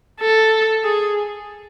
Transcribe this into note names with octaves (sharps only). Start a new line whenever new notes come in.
A4
G#4